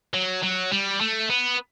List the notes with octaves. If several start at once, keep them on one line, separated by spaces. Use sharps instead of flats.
F#3
F#3
G3
A3
B3